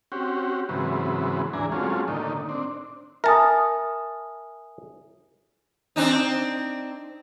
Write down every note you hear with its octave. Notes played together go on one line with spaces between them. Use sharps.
C4 C#4 F#4 G4
G#2 C#3 E3 F#3 B3 C4
D2 G#2 E3 D4 G#5 A#5
F#3 G#3 A3 C4 C#4 F4
A2 D3 D#3 A#3 D#4
C4 D4
A#4 E5 G#5 A5 D#6
C4 D4 D#4